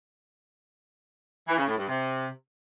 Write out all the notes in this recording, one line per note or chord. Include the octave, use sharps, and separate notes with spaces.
E3
C#3
A2
G2
C3